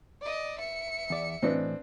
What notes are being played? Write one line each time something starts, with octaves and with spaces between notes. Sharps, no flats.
D5 D#5
E5 C#7
E2 D5
A2 E3 C4 D4 B4 D#5